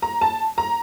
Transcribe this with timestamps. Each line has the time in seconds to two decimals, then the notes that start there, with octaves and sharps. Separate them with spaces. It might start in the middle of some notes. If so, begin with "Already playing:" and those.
0.02 A#5
0.21 A5
0.58 A#5